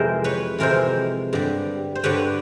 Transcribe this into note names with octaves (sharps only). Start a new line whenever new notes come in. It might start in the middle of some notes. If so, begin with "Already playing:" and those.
Already playing: F2 C3 E3 G#3 A#4 C5
B4 C#5
F2 C3 E3 G#3 A#4 C5
G2 D3 G3
C5
G2 D3 G3 B4 C#5